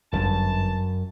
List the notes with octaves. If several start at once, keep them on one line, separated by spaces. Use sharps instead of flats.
G1 F#2 A5